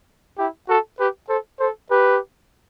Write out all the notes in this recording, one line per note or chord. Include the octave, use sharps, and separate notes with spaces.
E4 G4
F#4 A4
G4 B4
A4 C5
A4 C5
G4 B4